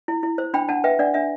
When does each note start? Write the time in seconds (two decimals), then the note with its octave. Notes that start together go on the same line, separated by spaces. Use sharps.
0.08 E4
0.23 E4
0.38 C5
0.54 D4 G5 B5
0.69 D4 F#5 A5
0.84 B4 E5 G5
0.99 D4 D5 F#5
1.14 D4 E5